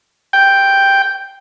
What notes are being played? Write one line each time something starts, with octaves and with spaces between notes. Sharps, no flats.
G5